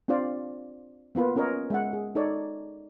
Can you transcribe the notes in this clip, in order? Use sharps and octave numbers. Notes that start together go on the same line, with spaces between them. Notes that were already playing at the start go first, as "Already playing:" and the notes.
C4 D4 F4 C5 D5 F5
A#3 B3 F4 B4
C#4 F4 A#4 C#5 D#5
G#3 E5 F#5
G#4
D#4 A4 C#5 D5